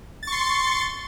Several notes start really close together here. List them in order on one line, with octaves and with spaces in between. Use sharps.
A6 C#6 C6